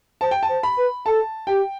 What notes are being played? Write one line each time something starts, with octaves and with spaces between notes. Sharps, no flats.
C5 A5
G5
A5
C5
B5
B4
A4 A5
G4 G5